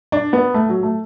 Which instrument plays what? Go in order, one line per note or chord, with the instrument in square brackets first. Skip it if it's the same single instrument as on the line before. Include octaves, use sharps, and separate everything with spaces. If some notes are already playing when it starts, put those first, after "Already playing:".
[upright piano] D4
B3
A3
F#3
A3